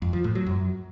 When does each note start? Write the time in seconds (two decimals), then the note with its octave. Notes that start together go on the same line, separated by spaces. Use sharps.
0.02 F2
0.13 F3
0.24 A2
0.35 F#3
0.46 F#2